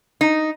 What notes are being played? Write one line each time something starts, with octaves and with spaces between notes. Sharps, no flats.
D#4